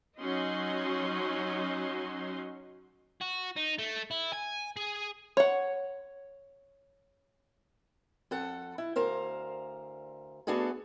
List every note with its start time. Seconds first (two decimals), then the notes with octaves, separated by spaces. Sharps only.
0.18 F#3 C#4 D#4 F#4 D#5 C6
3.21 F#4
3.57 D#4
3.79 A3
4.11 E4
4.33 G#5
4.77 G#4
5.37 C#5 F#5
8.31 F2 A4 F#5
8.78 E4
8.96 D2 A#4 C5 F5
10.47 A3 B3 D4 F#4 G#4 A4